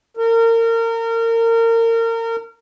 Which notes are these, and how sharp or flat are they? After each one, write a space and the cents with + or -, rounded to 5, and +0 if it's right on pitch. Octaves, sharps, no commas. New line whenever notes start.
A#4 -30